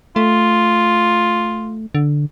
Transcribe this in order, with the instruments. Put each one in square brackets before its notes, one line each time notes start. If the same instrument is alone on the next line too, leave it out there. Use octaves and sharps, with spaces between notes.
[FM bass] A3 [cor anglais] F4
[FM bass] D3